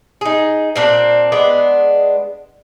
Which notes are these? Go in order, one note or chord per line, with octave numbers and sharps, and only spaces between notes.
D#4 G#4
A#2 C4 D4
G#3 B3 D4